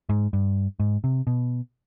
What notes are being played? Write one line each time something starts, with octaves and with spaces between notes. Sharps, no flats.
G#2
G2
G#2
C3
B2